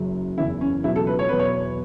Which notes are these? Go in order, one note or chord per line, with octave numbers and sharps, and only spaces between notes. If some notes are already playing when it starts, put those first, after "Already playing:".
Already playing: F#1 F#2 F#3
F#1 E2 E3 E4
C#4
C#2 B2 F#3 E4
A4
B4
C#5
E2 B2 F#3 B4
C#5